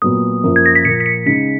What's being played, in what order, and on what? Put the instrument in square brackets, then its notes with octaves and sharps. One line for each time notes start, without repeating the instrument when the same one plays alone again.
[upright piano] A#2 F#3 B3 [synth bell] D#6
[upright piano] F#2 F3 A#3
[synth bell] G#6
A#6
B6
[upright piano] A#2 F3 A#3 [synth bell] C#7
[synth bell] B6
C#7
[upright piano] C#3 G#3 D#4 [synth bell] B6